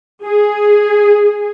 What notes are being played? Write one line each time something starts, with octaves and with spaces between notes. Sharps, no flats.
G#4